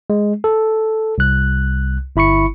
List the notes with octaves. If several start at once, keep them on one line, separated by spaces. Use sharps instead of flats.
G#3
A4
C2 F#6
G1 E4 B5 C#6 C#7